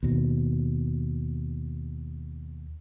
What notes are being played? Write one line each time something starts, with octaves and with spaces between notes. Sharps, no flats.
D#2 B2